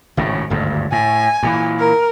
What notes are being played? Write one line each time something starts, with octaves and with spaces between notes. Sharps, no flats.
G#1 A2 C#3
G#1 D2 G2
A2 G#5
G2 A#2 E3
A#4